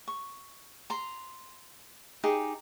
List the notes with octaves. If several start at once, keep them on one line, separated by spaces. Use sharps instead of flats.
C#6
A#5 C6
D#4 G4 G#4 G5